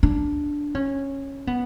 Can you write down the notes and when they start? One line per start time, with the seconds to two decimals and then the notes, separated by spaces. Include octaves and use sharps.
0.03 D4
0.75 C#4
1.47 B3